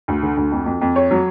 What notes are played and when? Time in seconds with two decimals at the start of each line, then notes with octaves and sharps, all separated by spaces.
0.08 D2
0.23 D3
0.37 D2
0.52 F2
0.66 F2
0.81 F2
0.96 C#5
1.11 F#3